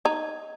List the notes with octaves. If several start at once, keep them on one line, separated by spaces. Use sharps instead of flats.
D#4 D#5